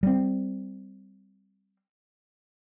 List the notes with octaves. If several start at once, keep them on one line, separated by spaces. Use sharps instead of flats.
G3 C4